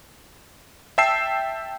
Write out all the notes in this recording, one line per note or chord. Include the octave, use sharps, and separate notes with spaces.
E5 G5 A5 E6 C7 E7